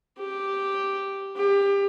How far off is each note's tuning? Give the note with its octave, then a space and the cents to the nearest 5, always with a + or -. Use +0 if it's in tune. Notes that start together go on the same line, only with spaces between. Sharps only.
G4 +0
G4 +25